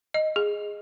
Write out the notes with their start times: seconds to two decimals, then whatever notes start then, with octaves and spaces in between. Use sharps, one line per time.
0.14 D#5
0.36 G#4